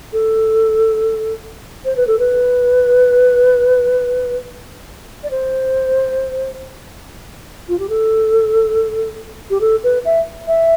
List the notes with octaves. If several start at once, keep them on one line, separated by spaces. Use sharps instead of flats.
A4
C5
B4
A4
B4
D5
C5
F4
G4
A4
G4
A4
B4
E5
E5